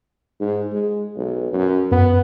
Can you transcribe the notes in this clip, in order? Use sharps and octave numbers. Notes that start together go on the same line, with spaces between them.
G#2
G#3
B1
F#2
F#2 B3